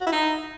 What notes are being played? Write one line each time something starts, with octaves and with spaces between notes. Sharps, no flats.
F#4
E4
D#4